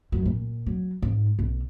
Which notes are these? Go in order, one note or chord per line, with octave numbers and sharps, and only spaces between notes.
F#2 F#3
A#2
F#3
G#2
B1